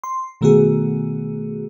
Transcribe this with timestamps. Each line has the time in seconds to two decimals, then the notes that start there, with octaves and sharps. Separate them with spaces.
0.04 C6
0.41 B2 D#3 A3 B3 F#4 G#4